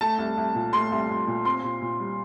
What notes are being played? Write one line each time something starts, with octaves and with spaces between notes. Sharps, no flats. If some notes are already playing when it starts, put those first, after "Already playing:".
A3 A5
C2
C2
A#2
A3 C6
C2
C2
A#2
C4 C6
A#2
A#2
G3